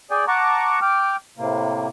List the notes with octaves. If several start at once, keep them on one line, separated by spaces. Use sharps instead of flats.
G#4 D5 G5 G#5
F#5 A5 A#5 C#6 D6
G5 D6 F6
A2 C3 A#3